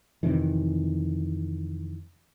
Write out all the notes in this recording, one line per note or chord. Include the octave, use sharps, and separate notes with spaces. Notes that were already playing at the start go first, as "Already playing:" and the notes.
F2 C3 D#3 E3